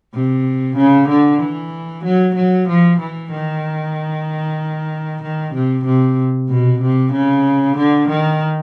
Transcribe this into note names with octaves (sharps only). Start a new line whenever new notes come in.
C3
C#3
D3
E3
F#3
F#3
F3
E3
D#3
D#3
C3
C3
B2
C3
C#3
D3
D#3